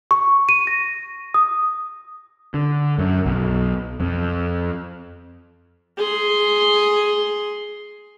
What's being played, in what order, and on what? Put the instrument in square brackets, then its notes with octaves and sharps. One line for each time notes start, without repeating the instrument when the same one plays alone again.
[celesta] C#6
D#7
A#6
D#6
[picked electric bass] D3
F#2
B1
F2
[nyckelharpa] G#4 C6